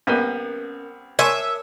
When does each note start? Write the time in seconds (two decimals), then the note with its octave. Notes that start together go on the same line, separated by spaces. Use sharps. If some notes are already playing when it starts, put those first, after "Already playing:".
0.07 C2 A#3 B3 C#4 A#4
1.19 A#4 C#5 E5 G#5 A5 C6 C#6